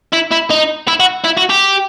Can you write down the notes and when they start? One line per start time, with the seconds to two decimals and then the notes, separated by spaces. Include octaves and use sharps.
0.13 E4
0.32 E4
0.51 D#4
0.88 E4
1.00 F#4
1.25 E4
1.38 F#4
1.50 G4